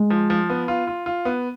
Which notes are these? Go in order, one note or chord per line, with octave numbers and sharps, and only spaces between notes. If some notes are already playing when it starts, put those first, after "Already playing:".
Already playing: G#3
F3
F3
B3
F4
F4
F4
B3